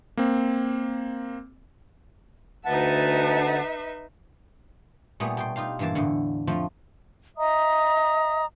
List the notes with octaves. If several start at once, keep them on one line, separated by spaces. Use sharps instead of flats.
A#3 C4
D2 D#4 B4 E5 F#5 A5
A#2 G3 A3 B3 G#4
B2 G5 C6
D#4 F4 G4 F5
G2 A#2 E3 A#3 A5
E2 A2 D3
F2 F3 A3 F4
D#5 E5 A#5 D#6